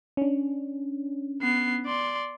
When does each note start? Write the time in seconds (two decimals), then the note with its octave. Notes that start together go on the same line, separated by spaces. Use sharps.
0.17 C#4 D4
1.41 B3 C7
1.86 D5 C6